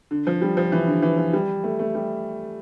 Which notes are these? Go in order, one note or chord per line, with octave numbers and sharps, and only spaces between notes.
D3
F3
G3
F3
E3
D3
E3
F3
G3
A3
A3
G3